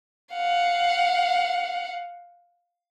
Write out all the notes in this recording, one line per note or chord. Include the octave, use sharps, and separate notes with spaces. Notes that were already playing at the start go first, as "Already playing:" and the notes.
F5 F#5